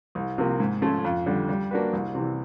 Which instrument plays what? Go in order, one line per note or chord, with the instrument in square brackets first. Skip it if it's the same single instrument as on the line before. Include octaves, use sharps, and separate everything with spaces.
[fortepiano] C2
C3 F3 A#3
G#2
F3 A3 C#4 F4
F2
D3 G3
G3
A#3 D4 F#4 B4
C2
C3 E3